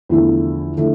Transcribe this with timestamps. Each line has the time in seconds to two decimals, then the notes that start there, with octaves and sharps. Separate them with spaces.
0.09 E2 D3 F3 A3 E4
0.77 D3 F3 A3 E4